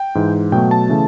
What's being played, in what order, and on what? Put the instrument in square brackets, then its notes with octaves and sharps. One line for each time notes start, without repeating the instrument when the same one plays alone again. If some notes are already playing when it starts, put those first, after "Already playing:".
Already playing: [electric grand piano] G5
G#2 E3 G#3
B2 F#3 A3 G5
A5
C#3 E3 A3